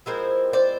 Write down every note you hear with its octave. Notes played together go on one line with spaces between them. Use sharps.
F3 G#3 C4 E4 A#4 C5
C5 D5